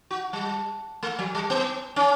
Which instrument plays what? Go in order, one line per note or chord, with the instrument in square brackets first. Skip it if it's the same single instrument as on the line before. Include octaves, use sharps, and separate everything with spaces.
[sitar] F#4
G3
A3
F#3
G3
B3
C#4